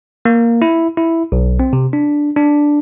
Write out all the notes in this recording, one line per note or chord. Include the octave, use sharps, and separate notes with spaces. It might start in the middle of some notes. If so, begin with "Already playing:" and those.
A#3
E4
E4
B1
C4
C3
D4
D4